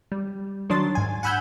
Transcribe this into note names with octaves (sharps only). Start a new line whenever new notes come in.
G3
D#3 F#3 D4 C6 A6
G#2 G#5
F#5 G#5 B5 E6 F#6 G6